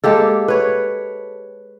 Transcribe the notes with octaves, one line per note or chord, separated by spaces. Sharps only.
G#3 A#3 G4 A4
B4 C#5